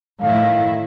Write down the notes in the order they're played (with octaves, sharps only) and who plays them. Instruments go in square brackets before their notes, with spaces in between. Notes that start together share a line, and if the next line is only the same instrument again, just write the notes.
[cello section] A2 D#3 E4 [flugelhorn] F5